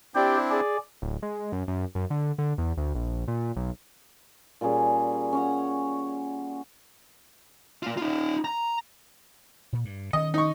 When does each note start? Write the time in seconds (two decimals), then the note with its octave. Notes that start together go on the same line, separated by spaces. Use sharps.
0.15 C4 D4 E4 G4 D5 G5
0.50 G#4 D5
1.02 D1
1.23 G#3
1.52 F#2
1.68 F#2
1.95 F#2
2.10 D3
2.38 D3
2.58 E2
2.77 D2
2.95 A#1
3.28 A#2
3.56 B1
4.61 A#2 G3 C#4 G#4
5.33 C#4 C#5 F#5
7.83 A#3 F4
7.97 D#4 F4
8.45 A#5
9.73 A#2
9.85 G2
10.13 D#3 B3 C#4 D#5
10.34 D#4 C#6